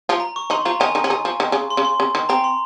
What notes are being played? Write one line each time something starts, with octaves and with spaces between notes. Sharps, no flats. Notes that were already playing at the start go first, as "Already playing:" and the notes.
F3 F4
A#5
C#6
D#3 D#4 C6
F3 F4 A#5
D#3 D#4 G#5
D#3 D#4
C#4
D#3 D#4
F3
D#3
C#3
C6
C#3
C6
C#3
D#3
C4 A#5
C6